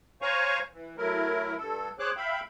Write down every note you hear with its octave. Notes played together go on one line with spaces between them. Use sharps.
C5 C#5 F5 G#5 A#5 C#6
E3
F#3 A3 E4 A#4
G2 A4
G#4 C5 C#5 D6 F#6
E5 F5 G5 B5